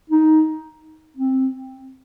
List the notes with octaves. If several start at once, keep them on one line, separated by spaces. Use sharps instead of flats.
D#4
C4